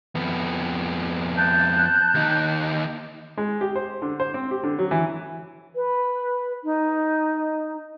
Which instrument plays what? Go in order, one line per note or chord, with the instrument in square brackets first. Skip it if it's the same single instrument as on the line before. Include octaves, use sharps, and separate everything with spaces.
[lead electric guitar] F2 B3
[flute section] A5 F#6 G6
[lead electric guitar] D#2 D#4
[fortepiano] G#3
G4
C5
D3
C5
C4
G4
D3
F#3
E3
[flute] B4
D#4